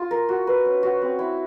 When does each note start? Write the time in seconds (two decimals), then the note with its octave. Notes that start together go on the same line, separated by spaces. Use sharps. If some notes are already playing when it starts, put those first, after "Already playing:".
Already playing: F4
0.11 A#4
0.29 F#4
0.47 B4
0.65 C#4
0.83 F#4
1.02 C4
1.19 E4